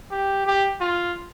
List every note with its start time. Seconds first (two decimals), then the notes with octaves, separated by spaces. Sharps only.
0.11 G4
0.47 G4
0.80 F4